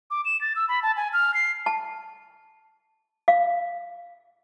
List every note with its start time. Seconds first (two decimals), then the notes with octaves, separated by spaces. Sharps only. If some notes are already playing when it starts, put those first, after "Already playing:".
0.11 D6
0.25 E7
0.41 A6
0.56 E6
0.68 B5
0.83 A5
0.97 G#5
1.13 F6
1.34 C7
1.66 A5
3.28 F5